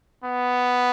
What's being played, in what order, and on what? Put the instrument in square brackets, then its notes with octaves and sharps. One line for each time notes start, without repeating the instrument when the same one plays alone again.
[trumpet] B3